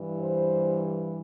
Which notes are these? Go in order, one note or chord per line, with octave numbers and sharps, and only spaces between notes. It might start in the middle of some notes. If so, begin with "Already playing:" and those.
Already playing: G2 E3 G3
C5